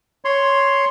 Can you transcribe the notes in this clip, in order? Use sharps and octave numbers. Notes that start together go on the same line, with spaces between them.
C#5 C6